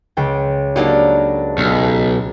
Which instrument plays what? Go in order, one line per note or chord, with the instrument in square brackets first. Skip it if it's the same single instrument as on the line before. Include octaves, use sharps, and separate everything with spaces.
[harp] C#2 G5
[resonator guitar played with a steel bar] F#3 A#3 D4 [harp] D#4 G4
[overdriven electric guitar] B1